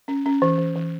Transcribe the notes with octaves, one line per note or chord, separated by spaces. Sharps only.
C#4
C#4
E3
E3
E3